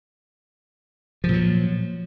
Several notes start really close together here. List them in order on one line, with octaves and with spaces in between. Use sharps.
F3 A#2 F#3